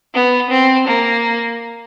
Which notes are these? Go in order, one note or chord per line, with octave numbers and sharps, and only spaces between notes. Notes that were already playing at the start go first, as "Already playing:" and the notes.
B3
C4
A#3